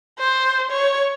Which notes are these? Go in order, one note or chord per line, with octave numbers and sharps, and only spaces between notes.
C5
C#5